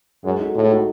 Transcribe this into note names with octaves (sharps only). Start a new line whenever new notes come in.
F#2 G#3
D#4 F#4 A4
A2 G#3
D#4 F#4 A4